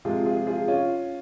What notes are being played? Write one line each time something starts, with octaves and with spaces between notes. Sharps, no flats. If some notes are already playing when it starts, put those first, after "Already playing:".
C3 F3 G#3 F4 G#4
F4 G#4
F4 G#4
C#4 F4